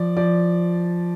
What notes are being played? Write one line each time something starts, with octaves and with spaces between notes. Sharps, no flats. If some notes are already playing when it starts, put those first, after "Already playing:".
Already playing: F3 D5
F3 D5